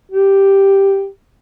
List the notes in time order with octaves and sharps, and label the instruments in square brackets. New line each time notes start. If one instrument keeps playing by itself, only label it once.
[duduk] G4